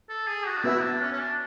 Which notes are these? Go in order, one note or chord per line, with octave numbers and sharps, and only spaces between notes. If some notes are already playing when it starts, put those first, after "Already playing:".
A4
G#4
F#4
D4
B3 E4 F#4 B4 E5
D4
C#4
C#4
D4